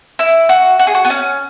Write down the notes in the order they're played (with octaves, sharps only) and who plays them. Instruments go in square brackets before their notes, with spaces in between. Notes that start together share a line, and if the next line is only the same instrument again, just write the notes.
[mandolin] E4
F#4
F#4
G#4
F#4
B3
C#4